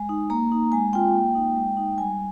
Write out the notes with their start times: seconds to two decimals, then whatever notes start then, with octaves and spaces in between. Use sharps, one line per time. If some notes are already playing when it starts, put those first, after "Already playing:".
Already playing: G#3 G#5
0.09 D#4
0.30 A#3 A#5
0.52 D#4
0.72 G#3 G#5
0.93 C4 F4 G5
1.15 A#3
1.35 D#4
1.56 G#3
1.77 D#4
1.98 G3 G#5